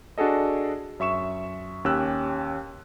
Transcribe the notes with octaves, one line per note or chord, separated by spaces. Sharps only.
D4 F#4 G#4 A4 D#5
F#2 E5 C#6 E7
D#2 C#4 G4 E6 F#6